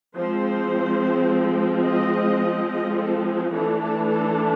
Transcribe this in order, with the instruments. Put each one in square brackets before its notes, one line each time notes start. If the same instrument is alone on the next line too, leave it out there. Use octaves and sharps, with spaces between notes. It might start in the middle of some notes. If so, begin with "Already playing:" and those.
[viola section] F3 G#3 C4 C5
D#5
D#5
A4
G#4
E3 A3 D4 A4
A4
A4